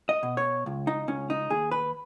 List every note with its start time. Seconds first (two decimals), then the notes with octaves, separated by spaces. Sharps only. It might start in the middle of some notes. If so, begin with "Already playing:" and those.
0.09 D#5
0.23 B2
0.37 C#5
0.66 C#2
0.87 D#4
1.08 C#2 C#4
1.30 D#4
1.50 D#2 G#4
1.71 B4